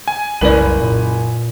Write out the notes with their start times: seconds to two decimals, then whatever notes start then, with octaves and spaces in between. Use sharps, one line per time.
0.08 G#5
0.41 F#1 C2 A#4 B4 D5
0.82 A#2